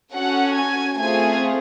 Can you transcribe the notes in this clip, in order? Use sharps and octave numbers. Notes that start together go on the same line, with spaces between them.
C#4 F#4 A4 F#5
G#5
A3 C4 F4 G#4 G#5